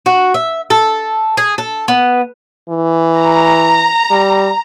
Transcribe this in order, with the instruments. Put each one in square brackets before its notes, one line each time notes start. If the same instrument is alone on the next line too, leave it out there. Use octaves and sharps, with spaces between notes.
[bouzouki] F#4
E5
A4
G#4
A4
B3
[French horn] E3
[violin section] A#5
[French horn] G3